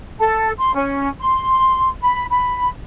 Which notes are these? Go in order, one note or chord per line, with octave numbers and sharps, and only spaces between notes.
A4
C6
C#4
C6
B5
B5